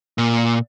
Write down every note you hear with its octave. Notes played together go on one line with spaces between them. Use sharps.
A#2